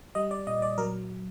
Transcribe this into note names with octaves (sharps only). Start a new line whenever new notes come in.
G3 D#5
D5
A#2 D#5
D5
F#3 A#4